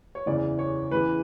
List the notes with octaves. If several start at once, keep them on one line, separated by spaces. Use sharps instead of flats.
C#5
F#1 E2 C#3 E3 D5
C#5
E2 C#3 E3 B4